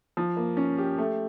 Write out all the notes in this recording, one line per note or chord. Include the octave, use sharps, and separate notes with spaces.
F3
A#3
C#4
G4
A3